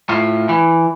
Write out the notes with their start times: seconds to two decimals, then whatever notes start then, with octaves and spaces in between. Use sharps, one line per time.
0.09 A2 F4
0.49 E3